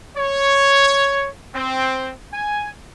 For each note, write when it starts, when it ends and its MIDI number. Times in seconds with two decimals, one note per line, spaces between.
0.17 1.29 73
1.54 2.10 60
2.33 2.70 80